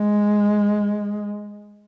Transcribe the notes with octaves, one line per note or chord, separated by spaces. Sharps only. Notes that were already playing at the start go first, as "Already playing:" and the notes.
Already playing: G#3